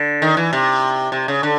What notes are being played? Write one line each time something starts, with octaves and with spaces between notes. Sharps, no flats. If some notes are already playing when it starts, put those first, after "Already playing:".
Already playing: D3
D#3
E3
C3
C3
C#3
D3